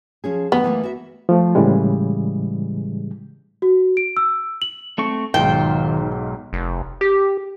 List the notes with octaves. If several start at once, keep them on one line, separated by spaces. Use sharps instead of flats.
F3 C#4 G#4
D#3 G3 A3 B3
E3 A3 A#3
F#4 E5
F3 A3
A2 C#3 E3 G3 G#3
F#4
D7
E6
F#7
A3 C4 C#6
B1 G#2 D#3 F4 C5 G5
F1
G4